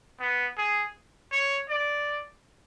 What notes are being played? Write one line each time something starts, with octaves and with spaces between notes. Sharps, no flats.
B3
G#4
C#5
D5